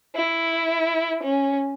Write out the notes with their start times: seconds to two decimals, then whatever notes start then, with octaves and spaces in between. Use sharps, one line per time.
0.16 E4
1.23 C#4